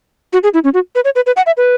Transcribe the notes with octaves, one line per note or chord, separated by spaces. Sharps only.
F#4
G#4
E4
C#4
F#4
B4
C#5
B4
B4
F#5
E5
B4